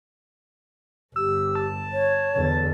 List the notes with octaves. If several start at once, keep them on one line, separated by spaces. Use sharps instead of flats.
G1 G4 E6
A5
C#5
E2 D3